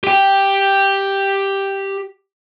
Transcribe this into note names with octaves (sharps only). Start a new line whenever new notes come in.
G4 G5